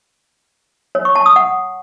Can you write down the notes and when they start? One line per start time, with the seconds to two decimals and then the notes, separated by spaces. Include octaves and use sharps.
0.95 C#5
1.05 C#6
1.15 A5
1.26 D#6
1.36 F#5